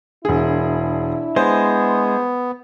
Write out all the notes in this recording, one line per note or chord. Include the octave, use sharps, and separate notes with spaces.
E1 D4 E4 G#4
G#3 B3 C5